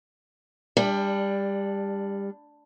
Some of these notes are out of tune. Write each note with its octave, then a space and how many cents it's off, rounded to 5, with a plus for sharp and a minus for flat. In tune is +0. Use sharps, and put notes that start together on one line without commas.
G3 +25 D4 +0 G5 +25